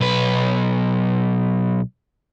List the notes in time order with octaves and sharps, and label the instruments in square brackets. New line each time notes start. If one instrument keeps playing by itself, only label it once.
[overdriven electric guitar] B1 B4